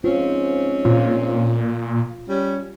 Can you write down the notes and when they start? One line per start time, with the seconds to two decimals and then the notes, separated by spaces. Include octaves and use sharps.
0.04 G#2 C4 C#4 F4
0.85 A#2 F4
2.27 G3 C#4